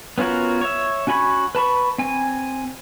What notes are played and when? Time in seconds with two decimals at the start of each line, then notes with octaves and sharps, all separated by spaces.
0.18 B3 C#4 F4 F#4 A#4
0.61 C#5 E5
1.07 C#4 F#4 G#5 B5 C#6
1.55 B4 A5 B5 C#6
1.98 C4 G#5